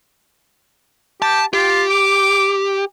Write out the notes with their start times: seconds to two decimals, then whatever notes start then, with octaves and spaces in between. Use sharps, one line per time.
1.22 G4 A5
1.54 F4 G4
1.90 D6